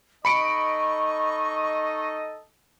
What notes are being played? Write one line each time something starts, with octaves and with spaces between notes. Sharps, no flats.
D#4 A4 D#5 B5 C#6 C#7 D7